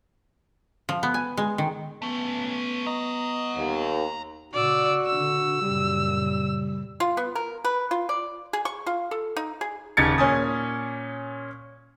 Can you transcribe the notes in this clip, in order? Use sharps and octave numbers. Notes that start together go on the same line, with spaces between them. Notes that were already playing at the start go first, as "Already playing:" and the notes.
F3
B3
G#5
G#3
D#3
A3 B3 C#4
D#5 F#5 A#5
D#2
A#2 C#3 F#4 D5 E6
D3 E6
F#2 A#2 C#3 G3
F4
B3
A#4
B4
F4
D5
G#4
C#6
F4
A4
D#4
G#4
D#1 C#3 D#4 G#6 A6 C#7
A#2 C#4 G#5 D#6